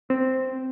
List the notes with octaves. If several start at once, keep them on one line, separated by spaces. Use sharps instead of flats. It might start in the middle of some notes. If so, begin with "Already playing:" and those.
C4